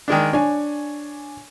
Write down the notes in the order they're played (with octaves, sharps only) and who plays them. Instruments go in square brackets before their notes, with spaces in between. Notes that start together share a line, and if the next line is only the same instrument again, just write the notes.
[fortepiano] D#3 G#3 D4
[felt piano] D4 G#5 [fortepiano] C#5